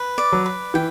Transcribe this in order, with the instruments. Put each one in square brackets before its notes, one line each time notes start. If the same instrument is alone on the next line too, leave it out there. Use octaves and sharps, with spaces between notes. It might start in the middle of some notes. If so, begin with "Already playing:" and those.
Already playing: [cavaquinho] B4
D5
[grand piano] F#3
[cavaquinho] B4
[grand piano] E3 [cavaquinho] G5